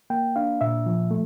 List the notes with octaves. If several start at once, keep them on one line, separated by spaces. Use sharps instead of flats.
A#3 G5
D4 F5
A#2 E5
F3
A3